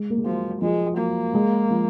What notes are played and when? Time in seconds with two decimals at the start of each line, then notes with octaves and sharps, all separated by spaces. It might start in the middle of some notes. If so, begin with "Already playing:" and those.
Already playing: G#3
0.10 A#3
0.18 G#3
0.25 F3 F#3
0.61 F3 G#3
0.97 F#3 A#3
1.34 G#3
1.71 F3